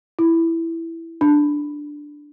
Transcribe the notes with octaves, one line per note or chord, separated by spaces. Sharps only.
E4
D4